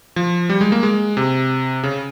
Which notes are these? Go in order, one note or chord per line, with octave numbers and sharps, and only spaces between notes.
F3
G3
G#3
A#3
G#3
C3
C#3